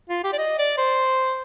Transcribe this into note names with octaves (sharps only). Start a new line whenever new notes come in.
F4
G4
D5
D#5
D5
C5